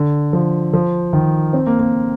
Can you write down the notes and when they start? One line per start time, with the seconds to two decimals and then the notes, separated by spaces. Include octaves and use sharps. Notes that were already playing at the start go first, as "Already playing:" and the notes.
Already playing: D3
0.33 F3
0.74 F3
1.13 D#3
1.53 C4
1.67 A#3
1.80 A#3